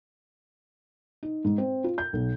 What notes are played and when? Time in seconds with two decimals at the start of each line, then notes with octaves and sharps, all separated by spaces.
1.23 D#4
1.44 G#2
1.58 C4
1.84 F4
1.98 G6
2.13 B1